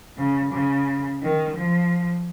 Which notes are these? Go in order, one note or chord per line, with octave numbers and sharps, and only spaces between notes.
C#3
C#3
D#3
F3